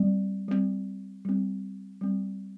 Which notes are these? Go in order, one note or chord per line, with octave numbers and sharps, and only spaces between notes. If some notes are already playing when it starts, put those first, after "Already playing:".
Already playing: G3 C4
G3 C4
G3 C4
G3 C4